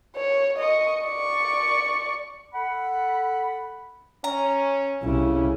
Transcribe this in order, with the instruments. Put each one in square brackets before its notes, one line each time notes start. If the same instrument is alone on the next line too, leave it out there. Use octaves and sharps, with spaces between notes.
[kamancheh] C#5
D#5 C#6
D5 C#6
[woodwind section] A4 F#5 B5
[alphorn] C#4 [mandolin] A#5
[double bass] C2 [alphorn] C#3 [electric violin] C#4 E4